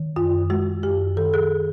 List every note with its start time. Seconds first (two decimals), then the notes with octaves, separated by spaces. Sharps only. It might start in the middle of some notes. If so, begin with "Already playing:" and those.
Already playing: D#3
0.16 F#2 F4
0.50 G#3 F#4
0.83 F#2 G4
1.17 D#3 A4
1.34 G#4